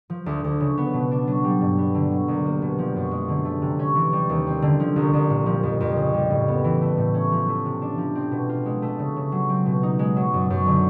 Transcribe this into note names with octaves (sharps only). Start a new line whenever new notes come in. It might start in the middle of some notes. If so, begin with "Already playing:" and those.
F3
D2
D2
C#3
B3
B2
D4
F#3
G3
G2
B3
D3
F#3
C2
A#3
B2
F3
F#2
G#3
D3
A3
C3
C#4
E3
G3
D#2
C4
D3
F3
C2
C2
A#2
F3
F2
F2
C#3
G3
A2
B3
E3
A3
A2
C#4
F3
A3
C3
D4
F3
C4
B2
F4
G#3
A3
C#3
C#3
F#3
C4
B2
D#4
G#3
F#3
F#2
F#2
D3